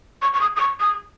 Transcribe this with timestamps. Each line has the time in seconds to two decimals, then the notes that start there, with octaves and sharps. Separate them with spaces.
0.22 C#6
0.34 C#6
0.41 D#6
0.56 D#6
0.60 C#6
0.80 D#6